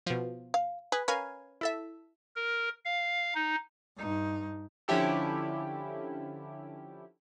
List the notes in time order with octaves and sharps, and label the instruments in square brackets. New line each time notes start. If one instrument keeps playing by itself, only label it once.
[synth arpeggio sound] B2 F3
[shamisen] F5
[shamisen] G#4 [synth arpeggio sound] B4
[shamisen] C#4 B4 [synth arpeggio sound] A#4 F5 G#5
[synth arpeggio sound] E4 A4 E5
[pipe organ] A#4
F5
D#4
[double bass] G2 D#4
[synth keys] D3 F3 C#4 E4 G4 A4